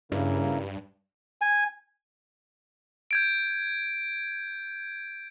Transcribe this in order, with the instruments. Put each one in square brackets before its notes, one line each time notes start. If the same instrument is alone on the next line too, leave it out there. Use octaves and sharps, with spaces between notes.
[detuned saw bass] G2 [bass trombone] C#3 [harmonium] A#3 E4 A#4
[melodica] G#5
[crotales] G6 G#6 D7